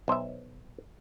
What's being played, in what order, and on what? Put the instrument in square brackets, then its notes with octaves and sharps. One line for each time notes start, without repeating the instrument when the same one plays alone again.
[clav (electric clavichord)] B1 C5 D#5 E5